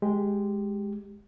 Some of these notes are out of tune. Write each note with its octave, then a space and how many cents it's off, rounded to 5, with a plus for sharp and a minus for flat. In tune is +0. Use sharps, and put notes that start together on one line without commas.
G#3 +0 G4 +0